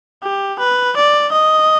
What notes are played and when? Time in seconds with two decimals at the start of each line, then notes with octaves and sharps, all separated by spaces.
0.23 G4
0.59 B4
0.97 D5
1.32 D#5